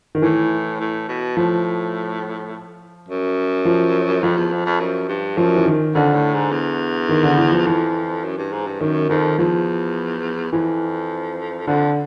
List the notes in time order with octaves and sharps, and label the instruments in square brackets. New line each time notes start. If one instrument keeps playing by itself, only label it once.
[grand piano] D#3
[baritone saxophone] A2 [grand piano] E3
[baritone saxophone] A2
B2
[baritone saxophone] A2 [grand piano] F3
[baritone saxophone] F#2
[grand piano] F3
[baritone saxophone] F2 [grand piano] F3
[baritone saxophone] E2
F2
F2
F#2
G2
[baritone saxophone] F#2 [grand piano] F3
[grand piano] E3
D#3
[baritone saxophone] F2 [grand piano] D3
[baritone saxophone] A2
G#2
E2
[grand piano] D#3
D3
E3
F3
[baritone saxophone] F2 [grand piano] E3
[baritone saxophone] F#2
G2
G#2
G2
[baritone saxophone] F#2 [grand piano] D#3
[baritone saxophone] F2 [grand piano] D#3
[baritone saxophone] E2 [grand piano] F3
[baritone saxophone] F2 [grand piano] E3
[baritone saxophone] F2 [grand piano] D3